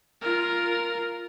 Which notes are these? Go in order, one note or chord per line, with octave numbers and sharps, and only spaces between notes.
F4 A#4